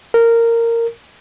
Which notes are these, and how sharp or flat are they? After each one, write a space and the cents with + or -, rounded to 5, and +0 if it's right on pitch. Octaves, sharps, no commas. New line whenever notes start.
A#4 -15